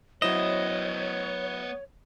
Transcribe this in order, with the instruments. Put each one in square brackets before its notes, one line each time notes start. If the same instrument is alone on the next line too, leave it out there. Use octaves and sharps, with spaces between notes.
[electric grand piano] F#3 E4 E7 [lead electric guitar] B3 C5 [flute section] C#5 [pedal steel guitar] D#5